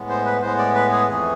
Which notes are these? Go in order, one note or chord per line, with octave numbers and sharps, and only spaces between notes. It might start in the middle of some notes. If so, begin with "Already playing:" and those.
Already playing: A2 G#3 B3
C5
B4
A2 G#3 B3 C5
D5
B4
G#4
F2 E3 A3 G#4